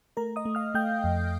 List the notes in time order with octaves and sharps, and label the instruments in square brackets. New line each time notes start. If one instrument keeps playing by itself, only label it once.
[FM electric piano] A3 A#4 A#5
D#5 D#6
A3
F5 F6
A3 G5 G6
F2